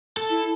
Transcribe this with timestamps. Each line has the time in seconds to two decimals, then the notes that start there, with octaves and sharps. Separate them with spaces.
0.17 A4
0.30 E4